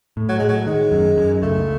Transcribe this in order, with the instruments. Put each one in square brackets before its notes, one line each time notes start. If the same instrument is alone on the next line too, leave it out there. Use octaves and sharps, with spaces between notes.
[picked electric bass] A2
[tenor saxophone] F#3
[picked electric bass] A2 [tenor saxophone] G#3
[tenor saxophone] F#3
[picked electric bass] D#3 [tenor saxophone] G#3
[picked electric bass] F#2
F#2
[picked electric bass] C#2 [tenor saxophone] A3